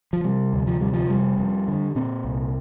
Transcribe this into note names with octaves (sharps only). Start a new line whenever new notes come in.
F3
C3 G3
D2
F3
C3 G3
F3
F1 G3
F2
D3
A#2 C4
C2